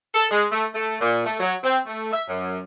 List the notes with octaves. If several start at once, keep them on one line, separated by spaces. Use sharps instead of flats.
A4
G#3
A3
A3
A#2
A3
F#3
C4
A3
E5
F#2